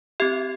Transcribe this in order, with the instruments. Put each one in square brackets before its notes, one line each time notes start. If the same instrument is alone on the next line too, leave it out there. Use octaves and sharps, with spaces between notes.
[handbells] C4 G4 E5